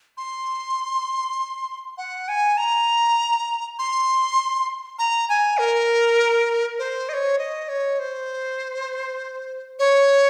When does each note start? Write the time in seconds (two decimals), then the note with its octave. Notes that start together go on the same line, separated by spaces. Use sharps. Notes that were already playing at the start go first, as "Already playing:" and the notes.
0.17 C6
1.98 F#5
2.28 G#5
2.57 A#5
3.79 C6
4.99 A#5
5.29 G#5
5.58 A#4
6.79 C5
7.09 D#5
7.13 C#5
7.38 D#5
7.69 C#5
7.99 C5
9.79 C#5